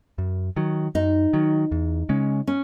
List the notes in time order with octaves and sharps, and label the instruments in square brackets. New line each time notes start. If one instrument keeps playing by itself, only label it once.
[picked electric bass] F#2
D#3 F#3
[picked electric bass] F#2 [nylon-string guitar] D#4
[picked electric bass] D#3 F#3
E2
C#3 G#3 C#4
[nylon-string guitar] C#4